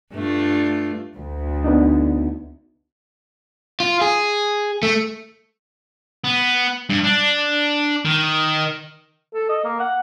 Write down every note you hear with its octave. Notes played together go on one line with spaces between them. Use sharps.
G2 A3 F4
D2
B3 D4 D#4
F4
G#4
A3
B3
G2
D4
D#3
A4
D#5
A#3
F#5